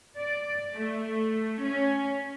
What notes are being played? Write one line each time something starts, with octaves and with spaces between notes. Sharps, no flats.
D5
A3
C#4